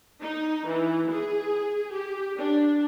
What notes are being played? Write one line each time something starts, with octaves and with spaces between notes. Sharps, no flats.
D#4
E3
G#4
G4
D4